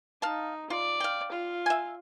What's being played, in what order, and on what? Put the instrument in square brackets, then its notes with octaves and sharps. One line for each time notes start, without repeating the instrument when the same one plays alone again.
[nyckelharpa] D#4 [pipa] F5 A5
[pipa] F4 [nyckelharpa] D5
[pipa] F5 G5
[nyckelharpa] F4
[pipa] E5 G#5